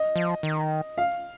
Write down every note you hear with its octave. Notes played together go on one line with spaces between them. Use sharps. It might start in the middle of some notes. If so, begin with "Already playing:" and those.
Already playing: D#5
F3
D#3
F5